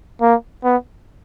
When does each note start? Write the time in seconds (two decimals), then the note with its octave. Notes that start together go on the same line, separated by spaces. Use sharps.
0.22 A#3
0.64 B3